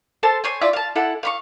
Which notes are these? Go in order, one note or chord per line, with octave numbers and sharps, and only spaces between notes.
A4 C5 A5 C6
C5 C#5 G#5
E4 F4 D5 E5
F5 A5
E4 A4 F#5
F5 B5 C#6